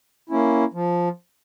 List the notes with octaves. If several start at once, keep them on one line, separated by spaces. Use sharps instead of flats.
A#3 C#4 E4
F3